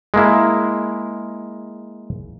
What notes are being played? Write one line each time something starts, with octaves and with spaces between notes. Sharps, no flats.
G#3 A#3 E4